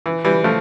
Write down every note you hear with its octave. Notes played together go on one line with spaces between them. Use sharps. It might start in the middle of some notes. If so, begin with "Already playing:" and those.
E3
E3 G3
F3 A3